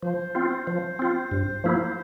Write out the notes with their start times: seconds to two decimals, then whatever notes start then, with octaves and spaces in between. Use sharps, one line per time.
0.02 F3 C5
0.35 C4 F4
0.67 F3
0.99 C4 F4
1.31 G2
1.64 F3 A#3 E4